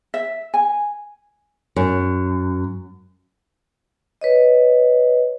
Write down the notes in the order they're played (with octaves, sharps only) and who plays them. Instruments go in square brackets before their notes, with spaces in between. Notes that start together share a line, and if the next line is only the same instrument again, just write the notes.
[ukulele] E5
G#5
[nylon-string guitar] F#2
[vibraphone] B4 C#5 D#5